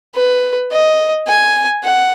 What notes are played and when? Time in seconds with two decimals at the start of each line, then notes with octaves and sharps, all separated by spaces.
0.16 B4
0.72 D#5
1.28 G#5
1.84 F#5